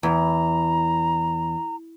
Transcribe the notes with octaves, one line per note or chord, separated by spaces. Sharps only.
E2 A#5